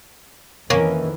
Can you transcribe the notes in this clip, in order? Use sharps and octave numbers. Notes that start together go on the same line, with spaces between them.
F2 D#3 E3 A#3 C#4